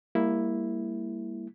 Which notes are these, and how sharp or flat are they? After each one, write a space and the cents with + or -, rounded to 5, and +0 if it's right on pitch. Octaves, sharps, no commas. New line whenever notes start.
G3 +40 A#3 +0 E4 +0